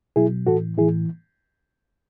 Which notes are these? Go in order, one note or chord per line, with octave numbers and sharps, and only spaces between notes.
B2 F#3 E4 G#4
A2 E3 F#4 A4
A2 E3 E4 G#4